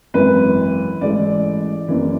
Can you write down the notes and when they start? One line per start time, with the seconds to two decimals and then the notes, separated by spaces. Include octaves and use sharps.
0.14 G#1 F#2 E3 B4
1.01 A1 G#2 E3 D5
1.88 F#1 F#2 E3